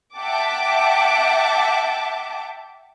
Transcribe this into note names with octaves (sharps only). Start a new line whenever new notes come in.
E5 F#5 G5 A5 D6